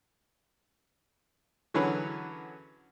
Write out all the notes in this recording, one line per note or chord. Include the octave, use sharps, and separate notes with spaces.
D3 E3 F#3 C#4 G#4 B4